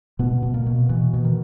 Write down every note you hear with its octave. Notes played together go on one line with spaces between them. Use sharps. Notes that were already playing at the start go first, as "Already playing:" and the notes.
B2 B3
B2
A#3
B2
B2 E3
B2
D#3